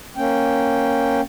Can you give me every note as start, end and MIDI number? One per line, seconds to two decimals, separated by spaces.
0.17 1.21 58
0.17 1.21 61
0.17 1.21 79